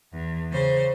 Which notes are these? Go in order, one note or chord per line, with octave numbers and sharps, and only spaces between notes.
E2
C#3 C5